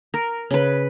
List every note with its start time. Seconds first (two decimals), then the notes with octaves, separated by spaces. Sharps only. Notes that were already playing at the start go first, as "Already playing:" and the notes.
0.14 A#4
0.51 C#3 B4